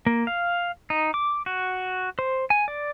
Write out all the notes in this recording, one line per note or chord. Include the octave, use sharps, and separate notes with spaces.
A#3
F5
D#4
D6
F#4
C5
G#5
D5